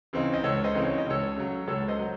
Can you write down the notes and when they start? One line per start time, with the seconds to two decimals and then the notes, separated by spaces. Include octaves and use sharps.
0.13 C#3 E3 C4 D#4
0.34 D#5
0.43 C#2 A4 C#5
0.64 C5 D#5
0.75 C#3 E3 C4 D#4
0.84 C#5
0.98 D#5
1.06 C#2 A4 C#5
1.36 C#3 F#3
1.67 C#2 A4 C#5
1.88 C5 D#5
1.99 F#3